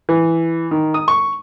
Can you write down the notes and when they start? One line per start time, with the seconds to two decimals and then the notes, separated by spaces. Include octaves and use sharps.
0.09 E3
0.71 D#3
0.94 D#6
1.08 C#6